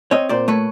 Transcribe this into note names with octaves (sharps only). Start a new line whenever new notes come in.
C4 C#5 D#5
A#2 C5 D5
A3 B4 C#5